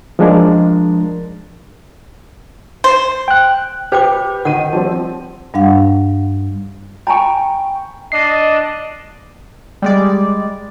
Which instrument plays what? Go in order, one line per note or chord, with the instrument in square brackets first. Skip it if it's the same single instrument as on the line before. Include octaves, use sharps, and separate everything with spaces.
[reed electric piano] F3 G#3 D4 A#4
[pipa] C5
[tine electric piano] G5 F#6
[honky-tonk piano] G4 B4 [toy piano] C5 G5 D6
[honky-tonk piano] D#3 D#7 [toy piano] F#5
[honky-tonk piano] F3 G3 C4
[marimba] G2 G3 D4 F5 F#5
[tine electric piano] G5 C#6 [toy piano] G#5 A#5 B5
[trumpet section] D4 D#5 [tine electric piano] C7
[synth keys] G3 G#3 D5